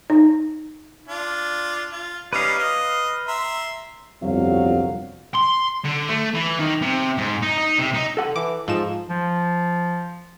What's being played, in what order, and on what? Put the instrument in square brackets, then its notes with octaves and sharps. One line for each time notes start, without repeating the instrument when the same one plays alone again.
[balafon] D#4
[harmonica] D4 F4
F4
[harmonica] G3 C#4 D#4 [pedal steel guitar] B4 F5
[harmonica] D#5
E5 A#5 C6
[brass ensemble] G1 C2 F2 F#3 F5
[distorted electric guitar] C6
D3
A3
E3
D#3
C3
G#2
D#4
D#4
C3
D#4
[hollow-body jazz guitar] A4 F#5
[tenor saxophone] E3 [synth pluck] D6
[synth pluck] G#2 E7 [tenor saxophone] F3
[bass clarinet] F3